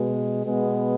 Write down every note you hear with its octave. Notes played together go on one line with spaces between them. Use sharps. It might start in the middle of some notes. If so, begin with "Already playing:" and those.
Already playing: B2 G#3 B3
B2 G#3 B3